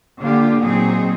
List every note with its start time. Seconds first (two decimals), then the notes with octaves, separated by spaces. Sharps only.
0.20 D3 A#3 F4 G4
0.62 A#2 F#3 C4 D#4 G#4